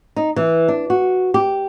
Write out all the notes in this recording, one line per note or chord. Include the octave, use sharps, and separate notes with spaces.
D#4
E3
D4
F#4
G4